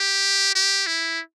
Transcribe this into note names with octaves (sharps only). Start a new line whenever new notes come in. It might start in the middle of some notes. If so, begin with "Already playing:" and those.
Already playing: G4
G4
E4